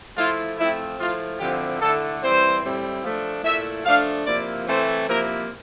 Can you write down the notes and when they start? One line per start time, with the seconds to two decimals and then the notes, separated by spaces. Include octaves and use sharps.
0.17 F3 A3 E4 F4
0.58 F3 A3 C4 E4
0.99 F3 A3 E4 F4
1.39 D3 F3 C4 E4 G4
1.81 D3 A3 E4 A4
2.22 E3 G3 C4 E4 C5
2.63 A2 G3 C4 E4
3.04 F3 A3 D4
3.44 A#2 A3 E4 E5
3.85 F3 A3 D4 F5
4.26 C3 F3 A#3 E4 D5
4.67 E3 A3 C4 E4 C5
5.08 C3 F3 A#3 E4 A#4